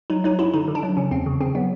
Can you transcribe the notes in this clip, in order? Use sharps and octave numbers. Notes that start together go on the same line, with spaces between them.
F#3 D#4
F#3 D#4
F#2 E4
D3 D#4
D3
D4
F#3
C#3 C#4
E2 C4
C#3
C#3 C4
F#3 B3